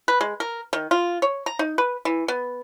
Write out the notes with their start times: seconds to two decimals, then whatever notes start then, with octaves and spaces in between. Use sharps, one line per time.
0.08 B4
0.21 G#3
0.40 A#4
0.73 D#3
0.91 F4
1.22 C#5
1.46 A#5
1.59 D#4
1.78 B4
2.05 E3
2.28 B3